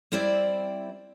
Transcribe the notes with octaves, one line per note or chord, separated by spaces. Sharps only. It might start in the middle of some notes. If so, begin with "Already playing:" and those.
G3 C4 E4 C5 D5 E5